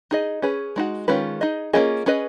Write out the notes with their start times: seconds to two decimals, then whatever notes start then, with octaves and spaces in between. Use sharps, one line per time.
0.11 D#4 G#4 D#5
0.42 C#4 G#4 B4
0.76 G#3 D#4 F#4
1.08 D#3 G#3 C#4 F4 B4
1.41 D#4 G#4 D#5
1.73 A#3 C#4 F4 G#4 D#5
2.06 C#4 G#4 B4 D#5